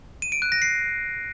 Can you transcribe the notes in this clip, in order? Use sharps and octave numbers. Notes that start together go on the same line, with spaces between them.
D#7
D7
F#6
A#6
C7